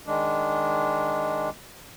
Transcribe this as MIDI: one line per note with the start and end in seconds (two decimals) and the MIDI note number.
0.07 1.49 51
0.07 1.49 56
0.07 1.49 62